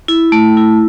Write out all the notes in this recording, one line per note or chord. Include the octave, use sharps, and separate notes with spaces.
E4
A3
E4